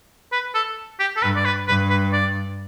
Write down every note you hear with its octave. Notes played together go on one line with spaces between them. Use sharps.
B4
A4
G4
A4
G2 B4
D5
B4
G2 B4
B4
D5